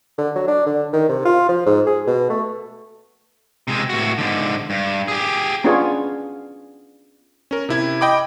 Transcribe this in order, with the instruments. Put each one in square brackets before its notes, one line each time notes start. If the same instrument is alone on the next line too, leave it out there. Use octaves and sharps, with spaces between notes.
[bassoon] D3
F#3
D4
D3
D#3
C3
F4
F3
G#2
G#4
B2
A3
[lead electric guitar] C3 G#3
A2 F#4
G#2 D3
G2
G4 G#4
[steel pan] B3 C#4 D4 F4 G#4 C#5
[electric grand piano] C#4 A#4
C3 E4 G#6
D#5 G5 B5 D6